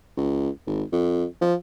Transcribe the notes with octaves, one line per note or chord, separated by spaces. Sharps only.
C#2
G#1
F2
F3